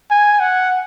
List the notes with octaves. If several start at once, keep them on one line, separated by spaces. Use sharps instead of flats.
G#5
F#5